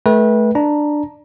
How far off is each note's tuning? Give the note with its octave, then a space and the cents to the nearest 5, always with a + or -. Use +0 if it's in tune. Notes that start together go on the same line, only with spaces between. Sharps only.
A3 -25 B4 -30 G5 +0
D4 +10 A#5 +15